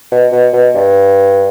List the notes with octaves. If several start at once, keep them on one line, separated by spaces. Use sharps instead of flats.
B2
B2
B2
G2